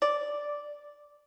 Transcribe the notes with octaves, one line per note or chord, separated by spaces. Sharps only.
D5